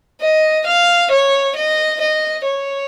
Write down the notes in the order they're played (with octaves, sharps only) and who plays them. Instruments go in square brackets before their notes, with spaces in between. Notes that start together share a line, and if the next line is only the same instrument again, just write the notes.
[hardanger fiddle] D#5
F5
C#5
D#5
D#5
C#5